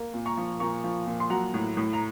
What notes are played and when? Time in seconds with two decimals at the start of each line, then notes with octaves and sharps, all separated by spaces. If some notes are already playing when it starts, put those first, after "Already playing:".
Already playing: A#3
0.14 A#2
0.26 A#5 C#6
0.37 F3
0.60 A#2 A#5 C#6
0.84 F3
1.06 A#2
1.20 C6
1.30 F#3 F#5 A#5
1.54 A2
1.77 A2
1.93 A#5